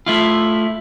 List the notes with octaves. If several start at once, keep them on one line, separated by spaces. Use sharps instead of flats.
A3 E4 F4